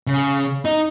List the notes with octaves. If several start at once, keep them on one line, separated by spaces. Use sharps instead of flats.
C#3
D#4